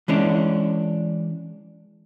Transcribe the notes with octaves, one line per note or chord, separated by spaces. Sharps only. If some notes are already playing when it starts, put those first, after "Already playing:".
E3 G#3 C#4 D4